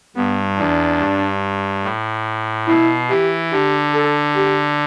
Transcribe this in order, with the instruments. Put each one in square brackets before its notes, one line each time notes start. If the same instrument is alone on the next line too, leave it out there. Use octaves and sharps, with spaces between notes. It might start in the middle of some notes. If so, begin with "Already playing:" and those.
[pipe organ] G2 [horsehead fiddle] B3
[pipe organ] E2 [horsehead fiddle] D4
[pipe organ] G2
A2
[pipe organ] B2 [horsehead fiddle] E4
[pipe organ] E3 [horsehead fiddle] G4
[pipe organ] D3 [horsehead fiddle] G4
[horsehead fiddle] A4
G4